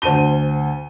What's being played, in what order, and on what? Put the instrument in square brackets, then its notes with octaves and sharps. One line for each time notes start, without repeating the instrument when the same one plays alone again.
[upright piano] D2 C5 A5 D#7 G7